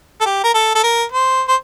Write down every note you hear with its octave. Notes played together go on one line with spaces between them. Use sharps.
A4
G4
A#4
A4
A4
A#4
C5
C5